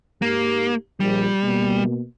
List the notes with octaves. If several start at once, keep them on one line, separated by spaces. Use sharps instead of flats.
G#2 A#3 G4
A#1 G3
B2 A#3